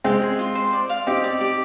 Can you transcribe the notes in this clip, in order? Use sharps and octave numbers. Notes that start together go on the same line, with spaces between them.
G#3 C4 F4
G#4
F4
C5
D5
F5
C4 D#4 G4
D5
G4